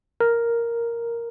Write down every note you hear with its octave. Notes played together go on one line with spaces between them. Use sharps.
A#4